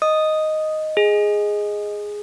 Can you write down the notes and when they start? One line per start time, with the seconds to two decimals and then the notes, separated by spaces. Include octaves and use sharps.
0.02 D#5 D#6
0.97 G#4